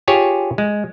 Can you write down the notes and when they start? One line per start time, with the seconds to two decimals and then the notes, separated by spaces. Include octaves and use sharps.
0.08 F4 G4 G#4 C#5
0.58 G#3